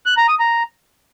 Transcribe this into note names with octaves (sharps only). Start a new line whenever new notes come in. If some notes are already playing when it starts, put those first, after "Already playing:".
F#6
A#5
D#6
A#5